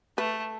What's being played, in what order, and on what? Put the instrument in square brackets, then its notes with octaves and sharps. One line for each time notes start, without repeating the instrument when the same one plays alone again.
[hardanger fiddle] A3 [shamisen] B4